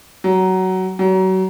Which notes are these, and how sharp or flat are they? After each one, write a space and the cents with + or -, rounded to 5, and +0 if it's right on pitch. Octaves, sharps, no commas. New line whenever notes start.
F#3 +15
F#3 +30